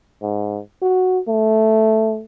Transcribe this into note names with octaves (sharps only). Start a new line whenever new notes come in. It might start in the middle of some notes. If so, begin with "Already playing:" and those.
G#2
F#4
A3